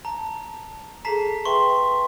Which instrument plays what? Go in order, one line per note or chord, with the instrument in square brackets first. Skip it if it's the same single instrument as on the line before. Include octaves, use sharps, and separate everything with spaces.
[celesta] A5 [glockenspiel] A#5
[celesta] G#4 A4 C7 [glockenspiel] A5 A#5 B6
[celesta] B4 E5 G5 [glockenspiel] C6 C#6